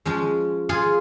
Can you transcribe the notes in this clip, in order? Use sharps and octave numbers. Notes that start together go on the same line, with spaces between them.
F3 G#3 C#4
F4 G#4